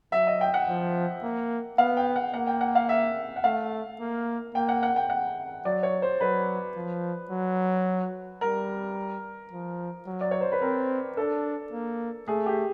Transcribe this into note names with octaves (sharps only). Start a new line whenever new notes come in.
F#3 E5
D#5
G5
F#5
F3
A#3
B3 F5
G5
F#5
A#3 F#5
G5
F#5
F5
E5
F#5
A3 F5
A#3
A#3 G5
F#5
F#5
G5
F#5
F#3 D5
C#5
C5
F#3 B4
F3
F#3
G3 A#4
F3
F#3
D5
C#5
C5
B4
C4 A#4
D4 A4
A#3
A3 G#4
G4